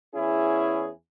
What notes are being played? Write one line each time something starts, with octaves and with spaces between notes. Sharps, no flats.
E2 C#4 E4 G#4